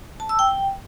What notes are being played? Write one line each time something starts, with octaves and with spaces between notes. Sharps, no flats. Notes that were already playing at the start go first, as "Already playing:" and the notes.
A5
E6
G5